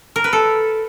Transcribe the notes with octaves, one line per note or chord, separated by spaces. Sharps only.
A#4
B4
A4